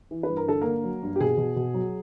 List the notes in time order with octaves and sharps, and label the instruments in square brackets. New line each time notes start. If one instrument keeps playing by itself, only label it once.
[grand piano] E3
B4
G2
A#4
D3 A4
D3 A#3 A#4
F#3
G2
G4
B2 G#4
B2
B2
F#3